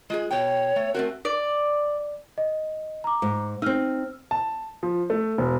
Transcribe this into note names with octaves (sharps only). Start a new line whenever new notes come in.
G#3 F4 G#4
B2 C#5 G5
A3
A3 C4 F#4 A#4
D5
D#5
A#5 D6
G#2
C4 D#4 E6 F6
A5
F3
A3
E1